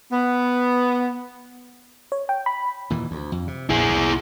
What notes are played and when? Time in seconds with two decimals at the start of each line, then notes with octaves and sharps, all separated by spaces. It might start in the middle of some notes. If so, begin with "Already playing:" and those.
0.11 B3
2.12 C#5
2.29 G5
2.46 B5
2.90 D#2 A#2 E3
3.11 D2
3.32 F2
3.47 C3
3.69 A#1 E4 G#4
3.90 C2